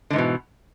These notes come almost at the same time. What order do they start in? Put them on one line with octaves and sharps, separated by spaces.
D3 G#2 E3 B2